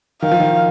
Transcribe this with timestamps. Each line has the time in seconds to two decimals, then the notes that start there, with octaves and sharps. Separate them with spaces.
0.22 D#3 F5
0.31 F3
0.40 D#3